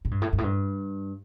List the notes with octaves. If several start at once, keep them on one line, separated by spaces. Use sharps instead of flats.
A2
G2
A2
G2
A2
G2